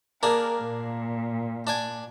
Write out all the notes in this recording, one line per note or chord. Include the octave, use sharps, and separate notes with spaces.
A#3 D4 G#4 A#4
A#2
D4 D5 G#5